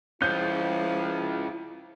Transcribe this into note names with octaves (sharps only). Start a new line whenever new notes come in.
F3 C#4 E4 F4 G6